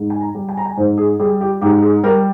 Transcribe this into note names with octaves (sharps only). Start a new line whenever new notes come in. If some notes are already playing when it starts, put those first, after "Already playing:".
Already playing: G#2
G#5
A#5
G3
G#5
A#5
G#5
G#2 C5
G#4
G3 G#4
G4
G#2 G4
G#4
G3 A#4